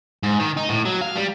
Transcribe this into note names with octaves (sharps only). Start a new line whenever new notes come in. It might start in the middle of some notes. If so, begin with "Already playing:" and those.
G#2
D#3
D#4
A2
F#3
F5
G3